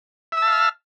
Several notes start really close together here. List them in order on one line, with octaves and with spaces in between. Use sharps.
E5 E6 A5 F5 F6